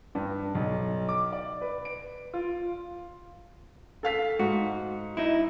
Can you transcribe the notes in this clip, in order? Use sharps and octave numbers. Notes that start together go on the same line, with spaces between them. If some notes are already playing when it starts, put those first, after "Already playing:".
G2
B1
D6
D5
B4
D7
F4
A4 F5 B6
G#2 F#4
D#4 E4